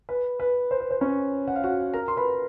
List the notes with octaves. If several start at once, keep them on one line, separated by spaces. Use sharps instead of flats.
B4
B4
C5
B4
C5
C#4 C#5
F#5
F5
F#4 F#5
A#4 A#5
C6
B4 B5